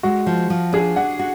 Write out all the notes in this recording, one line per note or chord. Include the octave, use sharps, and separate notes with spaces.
G#3 F#4
F3
F3
D4 G#4
D4 F#5
F#4